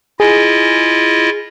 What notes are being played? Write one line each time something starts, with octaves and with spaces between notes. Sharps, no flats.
E4 F4 G#4 D#5